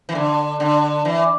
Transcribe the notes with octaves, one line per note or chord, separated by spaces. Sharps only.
E3
D3
D3
E3